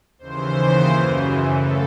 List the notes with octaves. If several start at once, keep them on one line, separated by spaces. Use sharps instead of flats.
D#2 C#3 E3 C5
F#2 C#3 E3
A2 A4